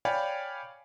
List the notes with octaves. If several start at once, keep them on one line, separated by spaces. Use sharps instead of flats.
C#5 D5 F5 G5 G#5 B5